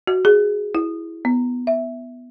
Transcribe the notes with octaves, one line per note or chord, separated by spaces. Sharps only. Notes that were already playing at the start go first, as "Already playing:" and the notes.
F#4
G#4
E4
B3
E5